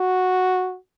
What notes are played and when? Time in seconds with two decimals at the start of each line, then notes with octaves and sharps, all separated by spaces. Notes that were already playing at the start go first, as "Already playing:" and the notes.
Already playing: F#4